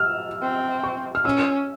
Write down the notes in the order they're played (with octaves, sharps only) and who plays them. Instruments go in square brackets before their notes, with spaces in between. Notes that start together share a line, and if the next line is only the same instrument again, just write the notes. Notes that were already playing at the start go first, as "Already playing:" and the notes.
Already playing: [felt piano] E6 F6
[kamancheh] C4
[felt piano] C#6
F6
[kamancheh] C#4 [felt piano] E6